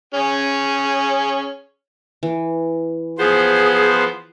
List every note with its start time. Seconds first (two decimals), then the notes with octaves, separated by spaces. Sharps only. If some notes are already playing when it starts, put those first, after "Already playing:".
0.14 C#4 G#4
2.23 E3
3.18 F3 B3 G#4 C5